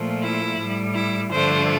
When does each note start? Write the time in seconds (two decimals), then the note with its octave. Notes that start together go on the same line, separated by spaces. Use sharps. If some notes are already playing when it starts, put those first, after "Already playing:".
Already playing: A#2 F3 A3
0.23 E4
0.59 A2 G3
0.95 E4
1.31 G2 D3 F3 A3 C5